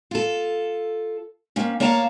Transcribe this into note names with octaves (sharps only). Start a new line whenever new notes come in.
F4 A4
A#3 C4 C#4
A#3 C#5 F5 A5 A#5